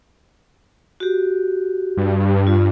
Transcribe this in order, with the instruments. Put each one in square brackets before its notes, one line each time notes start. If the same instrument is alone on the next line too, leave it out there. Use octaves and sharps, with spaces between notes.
[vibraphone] F#4 G4
[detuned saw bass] G2
[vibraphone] F4